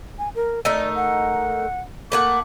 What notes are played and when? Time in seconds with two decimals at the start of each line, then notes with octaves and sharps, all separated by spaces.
0.19 G#5
0.35 A#4
0.65 A3 D#4 A#4 D5
0.95 F#5
2.12 A3 A#3 F#5 D6